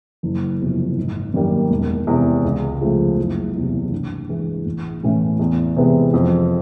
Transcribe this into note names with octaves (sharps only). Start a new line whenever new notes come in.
F#1
E2 C3 F3
G#1
F#2 D#3 G3 A#3
E1
E2 C3
C#2
C#3 F3 A3
F#1
E2 C3
G2
E3 G#3
A1
A2 E3 A3 C#4
E2
C3 E3 G#3 B3
F2